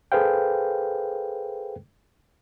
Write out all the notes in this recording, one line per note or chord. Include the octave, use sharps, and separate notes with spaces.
G#4 A4 B4 C5 F5 G5